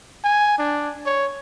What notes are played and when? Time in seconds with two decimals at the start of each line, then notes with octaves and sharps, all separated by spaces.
0.24 G#5
0.58 D4
1.06 C#5